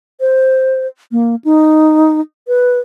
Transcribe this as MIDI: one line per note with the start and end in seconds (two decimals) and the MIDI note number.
0.20 0.87 72
1.12 1.36 58
1.45 2.20 63
2.48 2.79 71